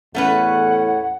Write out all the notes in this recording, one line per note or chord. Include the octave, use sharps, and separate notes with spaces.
E2 A2 A3 C#4 B4 F#5